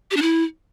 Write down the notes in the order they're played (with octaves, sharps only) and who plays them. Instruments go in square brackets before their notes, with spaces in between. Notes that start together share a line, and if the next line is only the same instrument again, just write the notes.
[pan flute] G4
D4
E4